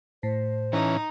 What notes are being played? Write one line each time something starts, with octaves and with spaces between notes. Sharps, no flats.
A2 C5
E3 C#4 D#4